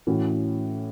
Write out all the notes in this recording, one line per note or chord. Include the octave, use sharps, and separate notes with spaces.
A2 E3 C#4 F#4